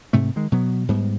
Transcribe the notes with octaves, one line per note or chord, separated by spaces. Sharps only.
G#2 C3 A3
D#3 G#3
B2 F#3 B3
G#2 G3 B3